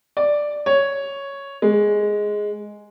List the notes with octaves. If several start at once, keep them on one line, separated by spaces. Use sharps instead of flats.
D5
C#5
G#3